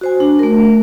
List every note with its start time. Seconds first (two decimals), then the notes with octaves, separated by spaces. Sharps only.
0.01 F#4 C5 G#5
0.20 D4
0.39 A3 A#4